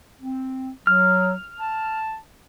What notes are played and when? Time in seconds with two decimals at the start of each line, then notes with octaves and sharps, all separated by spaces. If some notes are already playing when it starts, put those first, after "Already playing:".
0.21 C4
0.87 F#3 F6
1.60 A5